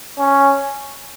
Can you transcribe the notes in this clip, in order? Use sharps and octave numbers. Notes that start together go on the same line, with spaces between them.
C#4